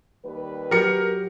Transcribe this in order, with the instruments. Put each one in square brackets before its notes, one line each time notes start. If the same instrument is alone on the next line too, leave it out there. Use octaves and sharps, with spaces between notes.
[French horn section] D#2 G3 B4
[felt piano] F#3 G4 C#7 [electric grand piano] A#4